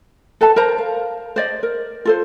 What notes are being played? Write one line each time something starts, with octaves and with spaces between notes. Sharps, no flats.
A4 B4 E5 A5
A#4 C5 A#5
F5
C5 D5 D#5
A#4
F4 A4 C5